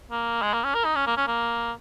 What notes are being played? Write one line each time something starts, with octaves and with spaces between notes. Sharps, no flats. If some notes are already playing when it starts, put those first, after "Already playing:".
A#3
G#3
A#3
C#4
A#4
D#4
C#4
A#3
C#4
A#3